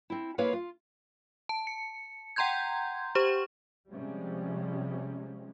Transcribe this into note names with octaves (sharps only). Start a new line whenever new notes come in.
C4 E4
G#3 A#3 E4 B4 C#5 F5
F4
A5
C#7
F#5 G5 A#5 C6 G6 G#6
G4 C5 C#6 E7
C3 F3 G3 G#3 C#4